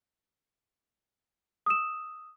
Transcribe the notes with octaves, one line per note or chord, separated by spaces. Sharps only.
D#6 E6 E7